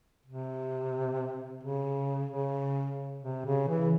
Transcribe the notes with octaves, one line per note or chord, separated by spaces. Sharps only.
C3
C#3
C#3
C3
C#3
E3